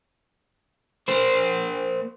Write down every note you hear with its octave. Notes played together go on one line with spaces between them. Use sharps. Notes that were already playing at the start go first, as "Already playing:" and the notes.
A#3 C5